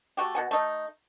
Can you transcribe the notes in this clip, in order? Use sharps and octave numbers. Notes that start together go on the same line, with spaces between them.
A3 F#4 G4
B2 F#5 G#5
A3 D#4